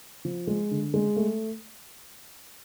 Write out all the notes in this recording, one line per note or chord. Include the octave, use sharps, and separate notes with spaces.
F3
G#3
D3
G#3
A3